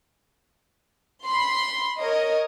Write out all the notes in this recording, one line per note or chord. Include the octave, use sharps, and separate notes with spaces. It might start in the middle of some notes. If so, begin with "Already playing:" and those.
B5 C6
A#4 C#5 D#5